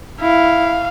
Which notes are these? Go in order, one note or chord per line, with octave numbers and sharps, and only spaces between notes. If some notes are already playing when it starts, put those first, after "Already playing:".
E4 F5